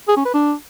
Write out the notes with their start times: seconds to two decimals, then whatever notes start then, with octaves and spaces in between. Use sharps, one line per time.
0.08 G#4
0.17 C#4
0.25 B4
0.34 D4